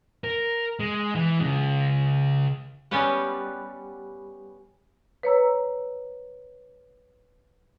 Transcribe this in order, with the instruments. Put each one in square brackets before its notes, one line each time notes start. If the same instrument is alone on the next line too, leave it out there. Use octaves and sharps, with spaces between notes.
[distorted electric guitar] A#4
G#3
E3
C#3 G#3
[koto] G3 B3 C#4 G4 B4 F#5
[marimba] B4 C#5 A#5 E6